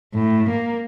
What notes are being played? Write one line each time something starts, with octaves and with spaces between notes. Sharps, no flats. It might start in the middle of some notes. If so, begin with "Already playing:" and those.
A2
A#3